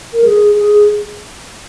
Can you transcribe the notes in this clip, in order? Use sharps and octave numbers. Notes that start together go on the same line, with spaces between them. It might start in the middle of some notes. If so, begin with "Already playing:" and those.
A#4
G#4
G#4